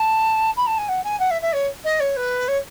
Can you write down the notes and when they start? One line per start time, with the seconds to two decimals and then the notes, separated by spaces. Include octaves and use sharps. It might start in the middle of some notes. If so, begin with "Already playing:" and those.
Already playing: A5
0.56 B5
0.66 A5
0.78 G#5
0.88 F#5
1.04 G#5
1.19 F#5
1.31 E5
1.42 E5
1.53 C#5
1.84 D#5
2.00 C#5
2.16 B4
2.48 C#5